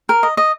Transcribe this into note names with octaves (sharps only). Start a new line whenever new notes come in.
A#4
D#5
D#5